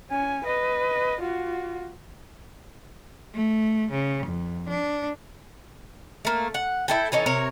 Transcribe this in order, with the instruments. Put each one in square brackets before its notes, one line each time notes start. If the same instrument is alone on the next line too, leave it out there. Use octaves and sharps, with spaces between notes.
[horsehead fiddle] C#4 G#5
B4 D#5
F4 F#4
[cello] A3
C#3
F2
D4
[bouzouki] A3 A#3
F#5
E4 A4 G5
E3 C#4 D#4 A4
C3 A#4 C#5